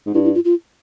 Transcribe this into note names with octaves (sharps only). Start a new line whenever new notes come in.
G#2
G2 E4
E4
F4
F4